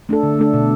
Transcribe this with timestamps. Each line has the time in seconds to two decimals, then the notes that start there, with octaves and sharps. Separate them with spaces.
0.09 A3 D4 A4
0.23 D3
0.39 A3 D4 A4
0.53 B2